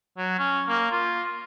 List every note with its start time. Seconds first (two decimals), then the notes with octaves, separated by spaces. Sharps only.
0.18 F#3
0.39 C#4
0.68 A#3
0.92 F4